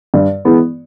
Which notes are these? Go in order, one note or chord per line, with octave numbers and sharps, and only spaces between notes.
G2
E3 G#3 B3